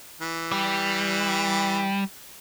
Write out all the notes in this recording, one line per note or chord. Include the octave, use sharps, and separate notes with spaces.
E3
G3